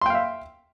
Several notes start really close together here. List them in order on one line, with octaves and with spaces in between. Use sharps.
C6 G5 F5 E5